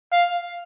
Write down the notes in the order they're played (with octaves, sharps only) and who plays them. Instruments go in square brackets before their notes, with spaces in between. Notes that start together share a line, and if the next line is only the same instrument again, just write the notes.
[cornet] F5